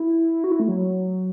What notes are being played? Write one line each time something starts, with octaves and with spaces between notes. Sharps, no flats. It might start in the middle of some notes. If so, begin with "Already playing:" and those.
Already playing: E4
F#4
E4
A3
F#3